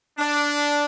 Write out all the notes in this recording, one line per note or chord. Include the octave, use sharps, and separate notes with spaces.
D4